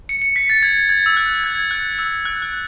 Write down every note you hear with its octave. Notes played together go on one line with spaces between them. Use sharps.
C#7
C#7
B6
A6
G#6
G#6
E6
F#6
G#6
F#6
E6
F#6
F#6